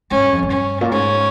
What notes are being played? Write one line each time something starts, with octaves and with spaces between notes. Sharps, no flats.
G#2 C#4
G2
F2
G2
C#4
A#2
G#2 C#4